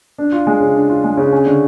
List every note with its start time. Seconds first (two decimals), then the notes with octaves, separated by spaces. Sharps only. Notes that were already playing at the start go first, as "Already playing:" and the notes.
0.18 D4
0.32 F4
0.47 G#3
0.60 C#3
0.74 D4
0.90 F4
1.04 G#3
1.17 C#3
1.32 C#4
1.46 D3